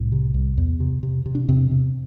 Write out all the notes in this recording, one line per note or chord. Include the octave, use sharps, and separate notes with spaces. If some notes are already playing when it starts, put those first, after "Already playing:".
Already playing: C2 A2
C3
C2
E2
C3
C3
C3
D4
E2 C3 C4
C3